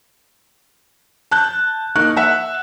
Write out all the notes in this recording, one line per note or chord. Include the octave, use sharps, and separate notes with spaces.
A5 F#6 G6
A#3 D#4 C#6 F#6
E5 F#5